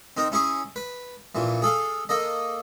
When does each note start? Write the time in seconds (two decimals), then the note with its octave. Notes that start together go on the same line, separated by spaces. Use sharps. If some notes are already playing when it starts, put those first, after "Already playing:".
0.17 C4 D#4 A#4
0.32 C#4 E4 G#4 C#6
0.76 B4
1.35 A#1 A#2 E3
1.62 G#4 A4 F5
2.09 A#3 A4 D#5